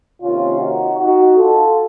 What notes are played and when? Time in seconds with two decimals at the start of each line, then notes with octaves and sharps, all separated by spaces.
0.22 C3 D#3 A#3 C#4 F4
0.60 D#4 F#4
0.98 D#4 F#4
1.36 F4 A4